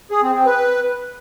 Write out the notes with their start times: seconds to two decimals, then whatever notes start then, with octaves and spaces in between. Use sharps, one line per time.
0.11 G#4
0.23 C4
0.35 C4
0.46 B4